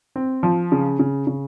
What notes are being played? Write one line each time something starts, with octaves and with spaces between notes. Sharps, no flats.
C4
F3
C#3
C#3
C#3